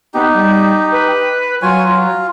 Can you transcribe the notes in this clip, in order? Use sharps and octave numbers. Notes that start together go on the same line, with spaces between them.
B3 D#4 G4
G3
B4
F#3 F4 C#5 G#5
F4